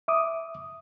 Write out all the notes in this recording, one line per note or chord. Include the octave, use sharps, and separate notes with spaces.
E5 D6 D#6